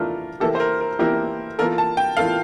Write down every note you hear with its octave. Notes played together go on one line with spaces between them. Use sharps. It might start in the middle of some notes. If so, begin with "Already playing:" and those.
Already playing: E3 A3 D4 F4 A4 A#4
E3 A#3 E4 G4 A4
C5
A#4
A#4
E3 A#3 E4 G4 A#4
E3 A#3 F4 A4 A#4
A5
G5
E3 A#3 F4 A4 F5